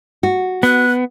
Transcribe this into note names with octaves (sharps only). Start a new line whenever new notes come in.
F#4
B3 F#6